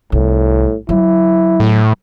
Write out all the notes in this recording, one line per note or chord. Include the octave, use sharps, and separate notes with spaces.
C2 A2
F#3 E4
A2